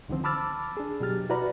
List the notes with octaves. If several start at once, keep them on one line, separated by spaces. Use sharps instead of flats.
C2 D3 D#3 F3 C4
A5 B5 D6 E6 F6 A6
D4 G#4
B2 F#3 G4 F6 A6
E4 F#4 B4 D5 A#5 B5